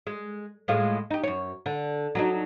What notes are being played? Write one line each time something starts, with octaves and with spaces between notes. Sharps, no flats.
G#3
A2 G#3 F4
D#4 G4
F#2 C#5
D3
F#3 D4 D#4